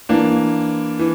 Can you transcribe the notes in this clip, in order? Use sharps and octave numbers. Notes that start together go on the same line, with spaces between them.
E3 A#3 D4
E3